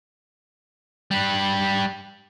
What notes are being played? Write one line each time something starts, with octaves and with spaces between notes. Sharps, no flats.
G3 B4